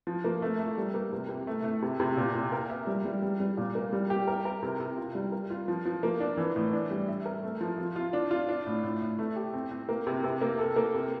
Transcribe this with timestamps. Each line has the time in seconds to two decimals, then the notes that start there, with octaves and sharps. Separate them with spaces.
0.07 F3
0.24 A#3
0.42 A3
0.59 A3
0.77 G3
0.94 A#3
1.13 C3
1.29 C3
1.47 A3
1.64 A3
1.82 C3
2.00 C3
2.17 A#2
2.34 A#2
2.52 A#4
2.70 E5
2.87 G3
3.05 G3
3.22 G3
3.40 G3
3.57 A#2
3.75 A#3
3.93 G3
4.10 G4
4.27 A#4
4.45 A#4
4.63 C3
4.80 C3
4.97 F4
5.15 G3
5.32 A#4
5.50 F4
5.68 F3
5.85 F3
6.03 A#3
6.20 D4
6.37 E3
6.56 A2
6.73 D4
6.91 G3
7.08 E5
7.26 A#4
7.43 A3
7.61 F3
7.78 F4
7.96 F4
8.13 D4
8.31 F4
8.49 D4
8.66 A2
8.83 A2
9.02 A2
9.19 A3
9.36 G4
9.54 C4
9.71 C4
9.89 A#3
10.07 C3
10.24 C3
10.41 A#3
10.59 A4
10.76 A#3
10.94 C3